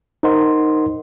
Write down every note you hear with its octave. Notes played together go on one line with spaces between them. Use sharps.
D#4 A#4 C5 D#5 F#5 C6